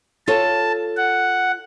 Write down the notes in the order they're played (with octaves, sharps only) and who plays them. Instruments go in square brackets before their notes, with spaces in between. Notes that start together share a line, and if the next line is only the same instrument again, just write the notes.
[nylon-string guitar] F4 A4 C#5 [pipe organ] A5
[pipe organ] F#5